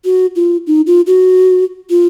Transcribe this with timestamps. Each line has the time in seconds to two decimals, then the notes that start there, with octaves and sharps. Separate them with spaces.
0.05 F#4
0.36 F4
0.67 D#4
0.87 F4
1.07 F#4
1.90 F4